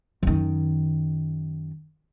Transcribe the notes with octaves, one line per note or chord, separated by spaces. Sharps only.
F#2 D#3